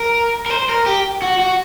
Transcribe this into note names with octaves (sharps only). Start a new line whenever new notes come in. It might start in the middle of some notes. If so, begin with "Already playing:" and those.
Already playing: A#4
A#4
C5
A#4
G4
F#4
F#4